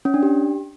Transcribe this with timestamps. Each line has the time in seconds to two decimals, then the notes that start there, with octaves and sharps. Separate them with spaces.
0.05 C#4
0.14 D4
0.23 G4